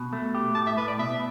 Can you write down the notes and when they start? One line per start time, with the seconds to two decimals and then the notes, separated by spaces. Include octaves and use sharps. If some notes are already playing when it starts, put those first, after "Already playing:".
Already playing: B2
0.13 A3
0.35 G4
0.55 A2 A5
0.67 E5
0.77 A2 B4
0.88 D5
0.99 B2 E5